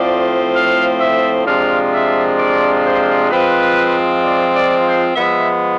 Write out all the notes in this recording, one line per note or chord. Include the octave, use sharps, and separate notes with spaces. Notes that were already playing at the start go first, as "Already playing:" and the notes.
Already playing: A2 F3 A3 C4 F4 D5
F5
E5
C3 F3 G#3 D4 F4 F5
E5
D5
C5
F3 G#3 C4 F4 B4
D5
D5
C5
F3 G#3 B3 E5